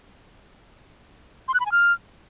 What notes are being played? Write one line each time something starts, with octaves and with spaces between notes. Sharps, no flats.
C6
F#6
B5
G#5
F6